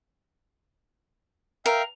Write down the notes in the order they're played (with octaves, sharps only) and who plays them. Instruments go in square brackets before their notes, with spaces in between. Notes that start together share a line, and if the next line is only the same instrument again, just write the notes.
[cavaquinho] A#4 [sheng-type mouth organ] E5 F5 G5